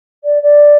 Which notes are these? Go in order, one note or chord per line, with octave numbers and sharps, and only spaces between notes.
D5
D5